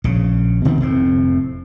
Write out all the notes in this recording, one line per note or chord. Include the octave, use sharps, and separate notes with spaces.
A#1 C#3
B2 D#3 B3 C4
F1 A2 C4